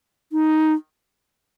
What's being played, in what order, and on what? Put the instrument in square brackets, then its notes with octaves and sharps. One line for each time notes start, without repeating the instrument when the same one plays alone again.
[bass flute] D#4